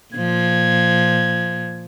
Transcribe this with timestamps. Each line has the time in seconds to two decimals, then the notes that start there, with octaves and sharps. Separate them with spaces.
0.14 A#2 F3 G#6